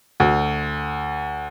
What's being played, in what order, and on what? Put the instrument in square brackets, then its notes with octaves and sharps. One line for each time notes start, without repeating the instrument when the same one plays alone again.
[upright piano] D2